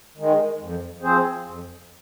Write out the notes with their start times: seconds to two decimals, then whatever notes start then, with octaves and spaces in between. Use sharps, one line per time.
0.17 D#3 G#3
0.60 F2
1.02 F3 C4 G#4 C5
1.45 F2